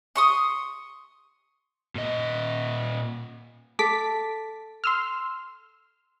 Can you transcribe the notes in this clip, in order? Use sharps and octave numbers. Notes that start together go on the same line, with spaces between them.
C6 C#6 D#6
A#2 D#5
A4 D6 B6
C6 E6 F6